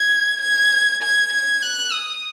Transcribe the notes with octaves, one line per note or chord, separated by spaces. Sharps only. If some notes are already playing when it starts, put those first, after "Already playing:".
Already playing: G#6
G#6
G#6
G#6
F#6
D#6